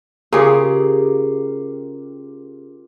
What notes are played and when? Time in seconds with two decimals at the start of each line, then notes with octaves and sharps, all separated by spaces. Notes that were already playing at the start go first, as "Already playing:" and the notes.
0.32 C#3 F4 G4 G#4 A#4